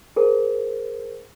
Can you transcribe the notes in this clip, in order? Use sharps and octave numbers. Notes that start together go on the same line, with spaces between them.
G#4 A#4 C5